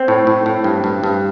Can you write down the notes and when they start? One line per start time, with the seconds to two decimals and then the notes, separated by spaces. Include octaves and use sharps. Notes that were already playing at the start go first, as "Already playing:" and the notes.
Already playing: C4
0.08 A2
0.27 A2
0.46 A2
0.64 G2
0.84 G2
1.03 G2